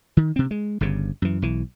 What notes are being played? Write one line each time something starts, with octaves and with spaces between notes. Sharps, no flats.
D#3
C3 C4
G#3
G1 G2 C#3
F#2 E3
B1 E3